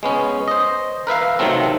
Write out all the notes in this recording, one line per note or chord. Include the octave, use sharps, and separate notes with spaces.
G#3 B3 C#4
C5 D#5
A#4 B4 E5 F5
C3 D#3 F#3 A3 C4